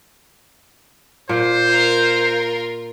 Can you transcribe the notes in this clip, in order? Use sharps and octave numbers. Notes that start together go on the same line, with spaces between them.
A#2 C5
F4 A#4